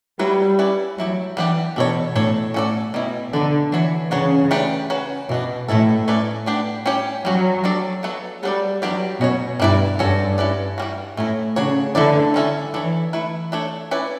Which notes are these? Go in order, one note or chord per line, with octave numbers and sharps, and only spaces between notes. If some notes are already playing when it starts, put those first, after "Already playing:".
F#3 G3 B3 E4 B4
C#4 E4 B4 D5
F#3 A3 E4 G4
E3 G3 B3 D4 G4
B2 D4 A4 C#5
A2 D4 A4 C#5
C#4 F#4 A4 D5
B2 G3 C#4 E4
D3 D4 A4 D5
E3 D4 F#4 C#5
C#3 B3 D4 F#4 C#5
A3 D4 G4 B4
C#4 F#4 B4
B2 E3 B3 D4
A2 A3 C#4 E4 A4
A3 C#4 E4 B4 D5
B3 D4 G4 D5
G3 C#4 G4 C#5
F#3 G3 C#4 F#4
G3 D4 A4 D5
F#3 B3 F#4 A4
F#3 G3 B3 D4 A4 D5
F#3 G3 B3 D4 G4 D5
B2 C#4 F#4 C#5
G2 G3 B3 E4 B4 D5
G2 C#4 F#4 A4 C#5
C#4 E4 B4 D5
E3 G3 C#4 F#4
A2 A3 C#4 E4
C#3 D4 F#4 C#5
D3 A3 E4 B4 D5
G3 C#4 E4 A4
E3 D4 A4 C#5
A3 E4 B4
A3 D4 A4 C#5
C#4 E4 B4 D5